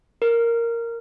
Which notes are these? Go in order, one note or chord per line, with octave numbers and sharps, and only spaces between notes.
A#4